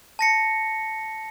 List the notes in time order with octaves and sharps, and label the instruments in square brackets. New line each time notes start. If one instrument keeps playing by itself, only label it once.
[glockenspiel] A5 A#6 C#7